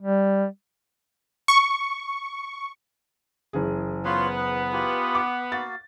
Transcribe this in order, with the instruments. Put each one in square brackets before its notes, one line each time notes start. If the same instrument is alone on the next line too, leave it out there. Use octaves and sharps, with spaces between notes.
[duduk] G3
[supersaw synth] C#6
[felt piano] F#1 E3 G#4
[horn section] B3 [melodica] F4 C#5 C6
[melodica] B4
F4 G4 G#5
[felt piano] D6
[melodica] A#3 F#4 F5 [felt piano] A6